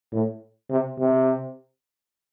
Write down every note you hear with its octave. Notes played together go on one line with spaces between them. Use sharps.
A2
C3
C3